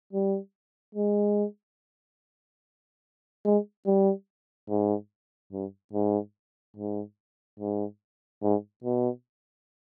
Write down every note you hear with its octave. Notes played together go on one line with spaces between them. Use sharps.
G3
G#3
G#3
G3
G#2
G2
G#2
G#2
G#2
G#2
B2